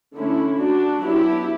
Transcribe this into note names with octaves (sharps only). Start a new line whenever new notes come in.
D3 A3 C#4 E4
D4 F#4
F#3 B3 D4 E4 G4